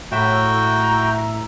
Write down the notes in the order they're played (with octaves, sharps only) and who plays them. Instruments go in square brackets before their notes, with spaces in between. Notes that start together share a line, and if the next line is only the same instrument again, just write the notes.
[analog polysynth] A2 E5 [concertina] F#4 G5 [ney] A#5